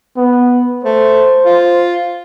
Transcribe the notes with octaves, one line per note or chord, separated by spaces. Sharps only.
B3
A3 C5
F4